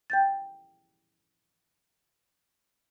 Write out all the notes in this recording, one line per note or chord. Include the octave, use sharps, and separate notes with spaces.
G5 G6 A6